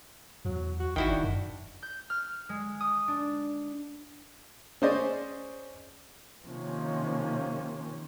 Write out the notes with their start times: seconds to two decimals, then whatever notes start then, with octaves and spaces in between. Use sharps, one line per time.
0.45 E2 F#3
0.80 F#4
0.96 G#1 D#3 E4 F#4 G5
1.09 F1 D4
1.23 F#2
1.82 G6
2.10 F6
2.49 G#3
2.80 D#6
3.08 D4
4.82 C#4 G#4 C5 D5 D#5
6.45 C3 D#3 F3 A#3 C#4